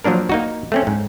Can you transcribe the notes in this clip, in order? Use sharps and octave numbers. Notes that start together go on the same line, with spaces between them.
F3 F#3 A#3 D4 A#4
A#3 D#4 F#4
A3 C4 C#4
G#2